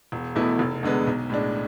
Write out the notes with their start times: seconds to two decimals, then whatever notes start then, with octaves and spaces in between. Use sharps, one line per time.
0.12 E1
0.35 E2 B2 A3 E4
0.59 F1
0.83 E2 D3 G#3 B3
1.07 B1
1.30 A2 G#3 D4